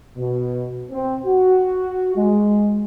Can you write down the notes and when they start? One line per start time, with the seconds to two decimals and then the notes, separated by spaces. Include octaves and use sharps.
0.18 B2
0.91 C4
1.26 F#4
2.16 G#3